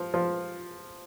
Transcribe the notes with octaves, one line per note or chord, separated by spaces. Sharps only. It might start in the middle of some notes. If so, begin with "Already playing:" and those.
Already playing: F3
F3